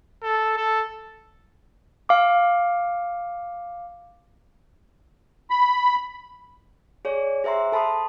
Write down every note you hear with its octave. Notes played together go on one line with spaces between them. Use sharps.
A4
A4
F5 D6
B5
G#4 C#5 D5
G#4 C5 E5 A#5 C6
A4 A5 B5 C6 D#6